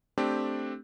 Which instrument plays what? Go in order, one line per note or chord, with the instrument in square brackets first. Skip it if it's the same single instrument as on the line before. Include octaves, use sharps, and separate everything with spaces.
[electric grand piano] A3 C4 D4 G4